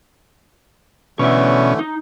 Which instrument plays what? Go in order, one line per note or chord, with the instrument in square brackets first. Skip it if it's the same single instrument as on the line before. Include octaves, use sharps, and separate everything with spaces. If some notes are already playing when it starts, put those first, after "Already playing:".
[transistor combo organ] B2 C#4 [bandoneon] D3 E3 A3 [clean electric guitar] C#5 D5 E5
[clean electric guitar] D#4